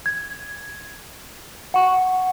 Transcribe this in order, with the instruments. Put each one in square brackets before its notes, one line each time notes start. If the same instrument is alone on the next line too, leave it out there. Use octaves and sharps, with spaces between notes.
[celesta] G#6
F#5 C#6